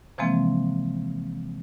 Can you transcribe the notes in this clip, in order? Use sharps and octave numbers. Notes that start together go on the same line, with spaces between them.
C3 E3 F3 G#3 A#3 C4